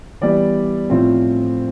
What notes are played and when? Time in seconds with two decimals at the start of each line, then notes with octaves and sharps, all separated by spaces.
0.21 E3 G3 B3 E4 D5
0.90 A2 F3 C4 F4